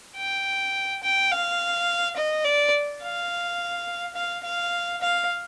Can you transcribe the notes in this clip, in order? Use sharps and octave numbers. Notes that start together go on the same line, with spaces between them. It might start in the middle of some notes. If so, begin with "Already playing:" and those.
G5
G5
F5
D#5
D5
F5
F5
F5
F5